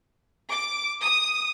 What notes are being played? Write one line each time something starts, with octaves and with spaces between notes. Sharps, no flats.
D6
D#6